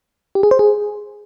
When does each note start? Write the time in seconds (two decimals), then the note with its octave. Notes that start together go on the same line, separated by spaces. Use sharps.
0.35 G4
0.43 G#4
0.51 C5
0.59 G#4